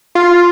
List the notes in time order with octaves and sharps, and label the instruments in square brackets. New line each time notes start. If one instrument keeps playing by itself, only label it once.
[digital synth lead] F4